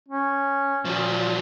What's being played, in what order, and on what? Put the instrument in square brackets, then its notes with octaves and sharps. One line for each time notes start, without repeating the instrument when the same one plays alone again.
[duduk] C#4
[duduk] A#2 [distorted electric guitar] F3 F#3